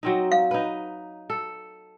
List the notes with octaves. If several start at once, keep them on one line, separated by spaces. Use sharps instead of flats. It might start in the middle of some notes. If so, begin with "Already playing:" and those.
F#3 C4 D#4
F5
D#4 B4
A4